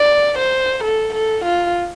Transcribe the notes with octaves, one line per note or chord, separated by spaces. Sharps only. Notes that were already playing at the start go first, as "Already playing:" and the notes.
Already playing: D5
C5
A4
A4
F4